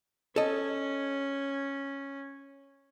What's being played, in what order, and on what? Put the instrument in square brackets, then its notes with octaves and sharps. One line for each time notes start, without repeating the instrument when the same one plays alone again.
[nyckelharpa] C#4 [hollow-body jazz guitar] A4 D#5